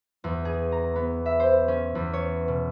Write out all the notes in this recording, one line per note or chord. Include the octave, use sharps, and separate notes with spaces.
E2
G#4
A#5
B3
E5
C5
C#4
E2
C#5
B2